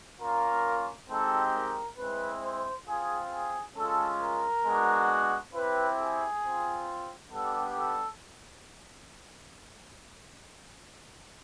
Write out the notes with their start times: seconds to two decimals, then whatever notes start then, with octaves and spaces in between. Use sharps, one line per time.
0.20 A#3 C#4 F4 A#4
1.09 G#3 C4 D#4 G4 A4
1.54 A#4
1.98 G#3 C4 E4 B4
2.42 C5
2.87 C4 F4 G#4
3.31 G#4
3.76 G#3 C#4 F4 A4
4.20 A#4
4.65 G#3 B3 D4 F#4
5.53 C4 E4 G4 B4
5.98 G#4
6.42 C4 F4
7.31 G3 B3 D4 G4 A4
7.76 A4